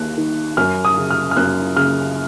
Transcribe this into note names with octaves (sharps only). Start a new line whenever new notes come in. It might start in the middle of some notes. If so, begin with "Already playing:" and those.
Already playing: D#2 F#6
D#3
F#2 F6
D#6
C#3
F6
F6
F#2 F#6
C#3 F6